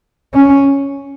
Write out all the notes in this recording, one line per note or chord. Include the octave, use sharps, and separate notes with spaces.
C#4